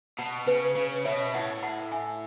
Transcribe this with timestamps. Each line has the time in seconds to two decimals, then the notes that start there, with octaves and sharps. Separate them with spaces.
0.19 B2 F#5 A5
0.47 C#3 B4
0.76 C#3
1.05 B2 C#5 E5
1.34 A2 F#5 A5
1.63 F#5 A5
1.92 E5 G#5